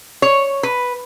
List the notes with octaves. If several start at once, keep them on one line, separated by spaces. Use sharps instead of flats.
C#5
B4